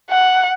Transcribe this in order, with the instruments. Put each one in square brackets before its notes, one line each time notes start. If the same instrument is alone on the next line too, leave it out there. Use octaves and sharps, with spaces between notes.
[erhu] F#5